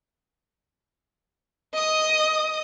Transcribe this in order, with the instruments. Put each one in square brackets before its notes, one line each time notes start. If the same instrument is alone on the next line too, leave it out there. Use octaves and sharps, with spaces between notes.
[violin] D#5 D#6